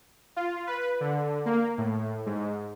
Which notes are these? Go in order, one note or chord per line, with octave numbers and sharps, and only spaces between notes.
F4
B4
D3
A#3
A2
G#2